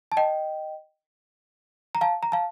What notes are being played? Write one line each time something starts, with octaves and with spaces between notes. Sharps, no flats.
A5
D#5 G5
A#5
F5 A5
A#5
F5 A5